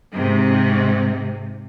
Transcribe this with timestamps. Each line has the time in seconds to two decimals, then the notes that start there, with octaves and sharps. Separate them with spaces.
0.13 G#2 C3